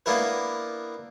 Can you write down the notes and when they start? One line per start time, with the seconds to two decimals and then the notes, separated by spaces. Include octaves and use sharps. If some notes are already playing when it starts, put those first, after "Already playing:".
0.06 A#3 B3 D4 E4 A#4 B4